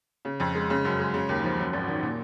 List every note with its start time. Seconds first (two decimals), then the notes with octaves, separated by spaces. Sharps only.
0.25 C#3
0.40 F2
0.55 G#3
0.70 C#3
0.85 F#2
0.99 G#3
1.14 C#3
1.29 D#2
1.44 F3
1.59 F#2
1.73 G#1
1.88 D#3
2.03 A#2